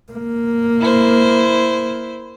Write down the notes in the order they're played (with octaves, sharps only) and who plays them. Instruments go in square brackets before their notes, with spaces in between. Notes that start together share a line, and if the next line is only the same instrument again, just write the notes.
[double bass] A#3
[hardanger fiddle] E4 C5